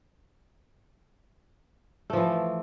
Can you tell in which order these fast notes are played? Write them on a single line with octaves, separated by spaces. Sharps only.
A3 F3 E3